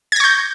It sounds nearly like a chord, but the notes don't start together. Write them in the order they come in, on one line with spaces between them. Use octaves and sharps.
G#6 A#6 C#6 G6